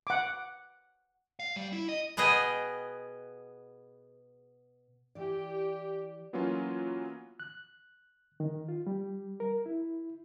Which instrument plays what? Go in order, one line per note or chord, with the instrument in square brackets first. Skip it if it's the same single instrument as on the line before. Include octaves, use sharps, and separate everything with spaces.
[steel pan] F#5 D6
[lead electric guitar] F5
G3
E4
D#5
[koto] B2 B3 G#4 B4 D#5 G5
[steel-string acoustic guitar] E3 D5 [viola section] G4
[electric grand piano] E3 F#3 A#3 B3 C#4 F4
[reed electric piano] F#6
D#3
F4
G3
A#4
E4